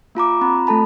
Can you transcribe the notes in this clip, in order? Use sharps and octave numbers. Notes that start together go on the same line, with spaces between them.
A#3 F4 A#5 D6
C4 F4 A#5 B5
A3 A4 A5 B5